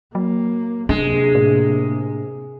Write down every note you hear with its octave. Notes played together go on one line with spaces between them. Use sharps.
F#3 A#3
C3 G#3 A#3 D4
A2